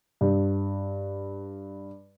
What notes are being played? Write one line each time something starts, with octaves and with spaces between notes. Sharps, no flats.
G2